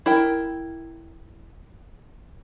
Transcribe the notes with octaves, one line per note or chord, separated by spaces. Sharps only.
E4 A#4 G5